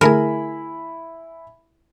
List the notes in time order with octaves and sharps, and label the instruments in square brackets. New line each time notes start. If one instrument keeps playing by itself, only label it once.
[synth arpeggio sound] D3 A3 G#4 [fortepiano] E4 G#5 B5 [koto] A#4